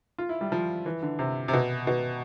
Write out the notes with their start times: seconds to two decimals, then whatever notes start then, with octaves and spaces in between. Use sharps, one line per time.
0.18 F4
0.29 E4
0.41 G3
0.52 F3
0.86 E3
1.03 D3
1.19 C3
1.48 C3
1.53 B2
1.87 B2